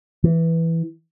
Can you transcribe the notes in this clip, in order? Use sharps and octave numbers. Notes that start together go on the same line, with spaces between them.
E3